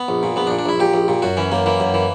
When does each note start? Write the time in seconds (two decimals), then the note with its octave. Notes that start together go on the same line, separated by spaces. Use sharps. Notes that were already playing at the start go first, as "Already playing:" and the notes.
Already playing: B3
0.08 A#1
0.23 A#2
0.36 A#1 B3
0.47 D4
0.51 A#2
0.58 D4
0.66 A#1 E4
0.80 A#2 G4
0.94 A#1
1.08 A#2
1.22 F#2 F#4
1.37 E3 C#4
1.52 F#2 A#3
1.66 E3 A#3
1.80 F#2
1.94 E3